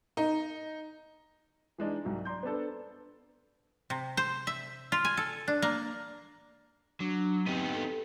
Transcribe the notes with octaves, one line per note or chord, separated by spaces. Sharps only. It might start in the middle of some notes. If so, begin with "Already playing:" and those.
D#4
E3 G#3 D4 D#4
C2 G#2 F#3
D5 A#5 C6 G6
B3 C4 D4 A4
C3
C5
E5
F4
G#5
A4
D4
A#3
F#3 D4
B3 C4 D#4 G4
A4